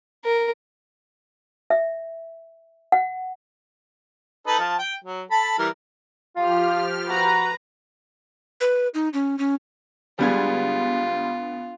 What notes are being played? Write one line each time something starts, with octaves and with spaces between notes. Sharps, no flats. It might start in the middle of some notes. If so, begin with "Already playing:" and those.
A#4
E5
F#5
D#4 A4 B4
F3 A5
G5
F#3
A4 A5 B5
E3 G3 A#4
F3 F4 G4 F6
F#4 B4 A#5
B4
D#4
C#4
C#4
D2 G3 G#3 B3 F4 G#6